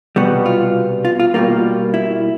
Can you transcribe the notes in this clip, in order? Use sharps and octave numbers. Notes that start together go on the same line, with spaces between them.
C2 B2 G3 B3 F#4
F4
F4
F4
B2 G3 A#3 F4
E4